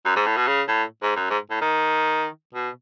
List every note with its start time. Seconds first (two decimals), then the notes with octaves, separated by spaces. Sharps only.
0.05 F#2
0.16 G#2
0.26 A2
0.37 B2
0.47 C#3
0.68 A2
1.02 G#2
1.16 F#2
1.30 G#2
1.50 A2
1.61 D#3
2.54 B2